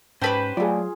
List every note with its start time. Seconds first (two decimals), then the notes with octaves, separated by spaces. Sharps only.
0.22 G#2 C#4 G4 B4 C5 G5 A5
0.57 F#3 A3 F4 G#4 D5